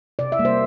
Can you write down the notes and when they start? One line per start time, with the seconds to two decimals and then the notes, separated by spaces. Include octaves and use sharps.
0.19 C3 D5
0.32 E5
0.39 G3 A#3
0.45 C5